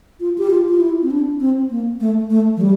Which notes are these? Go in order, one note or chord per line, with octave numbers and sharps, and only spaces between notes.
F4
G4
F4
F4
E4
C4
D4
C4
A#3
A3
A3
F3
G3